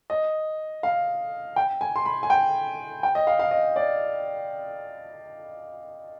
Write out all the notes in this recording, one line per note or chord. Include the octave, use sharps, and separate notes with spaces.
D#5
F5
G5
G#5
C6
B5
G#5
G5
G5
D#5
F5
F5
D#5
D5